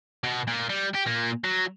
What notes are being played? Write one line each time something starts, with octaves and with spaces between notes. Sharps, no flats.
B2
A#2
G3
G4
A#2 A#3
F#3